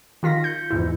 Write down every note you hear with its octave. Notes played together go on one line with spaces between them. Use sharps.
D#3 F4 A#6 B6
G6 C#7
E2 G#2 E4